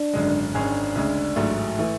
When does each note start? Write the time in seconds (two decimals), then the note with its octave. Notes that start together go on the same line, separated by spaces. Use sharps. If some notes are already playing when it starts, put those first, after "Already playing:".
Already playing: D4
0.13 G#1 F#2 D3 G#3
0.54 G#1 G#2 G#3 C#4 D4 G#4
0.95 D2 C#3 G#3
1.36 A1 G#2 F#3 A3
1.79 E3 A3